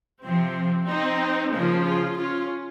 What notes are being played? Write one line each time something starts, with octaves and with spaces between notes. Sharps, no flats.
C3 F3 C4
C4 D#4
C#3 F3 A#3
F4 G#4
C#4 F4